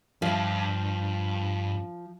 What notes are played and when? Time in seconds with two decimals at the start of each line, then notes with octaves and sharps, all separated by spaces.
0.22 G2 F3